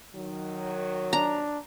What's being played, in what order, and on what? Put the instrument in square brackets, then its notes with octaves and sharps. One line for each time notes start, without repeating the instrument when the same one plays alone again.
[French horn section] D#3 F#3
[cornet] D4 [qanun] A#5